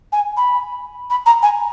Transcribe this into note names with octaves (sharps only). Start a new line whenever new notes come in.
G#5
B5
B5
A#5
G#5